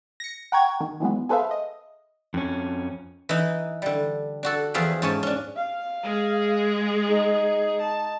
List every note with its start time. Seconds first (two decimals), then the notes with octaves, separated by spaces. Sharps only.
0.20 A#6 C#7
0.52 F#5 G5 A#5 C#6 G#6
0.81 D#3
1.00 D#3 E3 F#3 G#3 B3
1.29 G#4 A4 B4 C5 E5 F5
1.51 D#5
2.34 F2 C#4
3.29 E3 D#4
3.82 D3 G3
4.43 D4 F#4 A4
4.74 E2 F3 G#4 E5 G5
5.02 G#2 C#4 C#5 G#5 A5
5.23 C#4 D4
5.56 F5
6.03 G#3 G#4
7.07 D#4
7.81 A5